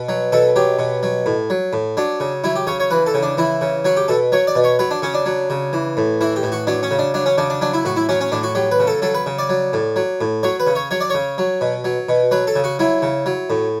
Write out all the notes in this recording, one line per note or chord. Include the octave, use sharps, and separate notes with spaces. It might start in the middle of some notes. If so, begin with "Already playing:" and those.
Already playing: B2
F#3
B2 A4
F#3 G4
B2
F#3
A2
F#3
A2
F#3 D4
C#3
F#3 E4
G4
C#3 C#5
C#5
E3 B4
A4
C#3
D4
E3 E4
C#3
F#3 F#4
G4
B2 A4
F#3 C#5
D5
B2
C#5
F#3 B4
D4
C#3 C#4
D4
F#3
C#3
E3
A2
E3 E4
G4
A2
F#4
F#3 D4
C#4
C#3
D4
F#3 D4
C#4
C#3 D4
D4
F#3 D4
E4
A2 F#4
E4
F#3 C#4
C#4
A2 D4
F#4
F#3 G4
B4
C#3
A4
F#3 A4
B4
C#3
D5
F#3
A2
F#3
A2
F#3 C#5
B4
C#3
C#5
F#3 C#5
D5
C#3 C#5
F#3
B2
F#3
B2
F#3 B4
A4
C#3
F#4
F#3 E4
C#3
F#3
A2